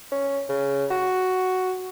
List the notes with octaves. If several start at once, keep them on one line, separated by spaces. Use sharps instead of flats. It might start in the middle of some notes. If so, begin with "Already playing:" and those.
C#4
C#3
F#4